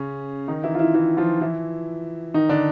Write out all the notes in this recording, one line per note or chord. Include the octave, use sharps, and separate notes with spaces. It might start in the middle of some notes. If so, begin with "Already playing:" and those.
Already playing: C#3 C#4
D#3 D#4
E3 E4
F4
E3 E4
E3 E4
F3 F4
E3 E4
D#3 D#4
D3 D4